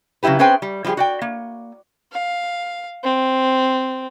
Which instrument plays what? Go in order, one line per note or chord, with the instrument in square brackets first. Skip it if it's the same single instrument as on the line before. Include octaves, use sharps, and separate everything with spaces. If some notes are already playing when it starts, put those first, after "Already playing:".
[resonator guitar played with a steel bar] C#3 F#3 G#3 E4 G4 B4
C4 C#4 G#4 B4 C5 G5
G3
F3 G3 G#3 G4 G#4
F#4 D5 G5
A#3
[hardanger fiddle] F5
C4